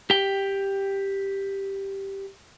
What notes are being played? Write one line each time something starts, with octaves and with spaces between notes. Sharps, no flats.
G4 G5